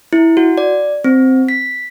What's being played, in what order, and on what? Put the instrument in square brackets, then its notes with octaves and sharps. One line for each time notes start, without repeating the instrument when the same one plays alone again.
[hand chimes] E4
F#4
D5
C4
B6